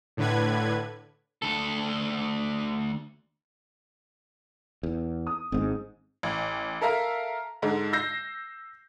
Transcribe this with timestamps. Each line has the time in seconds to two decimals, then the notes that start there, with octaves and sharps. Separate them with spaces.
0.17 A2 D3 B4 G#6
1.42 D2 A4
4.83 E2
5.27 D#6
5.52 G#1 G#2 G#3 C4
6.23 A1
6.81 A4 A#4 E5 F5 A#5 F6
7.62 G#2 D3 G#3
7.93 E6 G6 A#6 C7